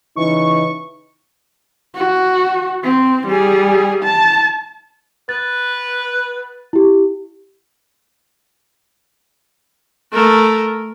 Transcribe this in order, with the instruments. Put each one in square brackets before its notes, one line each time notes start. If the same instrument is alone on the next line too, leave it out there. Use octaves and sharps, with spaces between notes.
[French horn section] C#3 E3 D#4 [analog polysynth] C#6
[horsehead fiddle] F#4
C4
G3 G#4
A5
[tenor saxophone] B4 [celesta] A6
[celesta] E4 G4
[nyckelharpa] A3 A#4